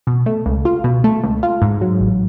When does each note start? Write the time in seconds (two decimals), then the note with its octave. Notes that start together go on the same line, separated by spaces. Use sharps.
0.07 B2
0.26 A3
0.46 C#2
0.65 F4
0.84 B2
1.04 A3
1.24 C#2
1.43 F4
1.62 G#2
1.81 F#3
2.01 A1